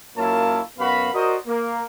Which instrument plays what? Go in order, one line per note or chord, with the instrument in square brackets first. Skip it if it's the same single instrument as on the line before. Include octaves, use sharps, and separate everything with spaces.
[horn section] F#2 A#3 E4 F4 C#5 A5
F#2 B3 F#4 F5 B5
F#4 A#4 C5 D5 D#5
A#3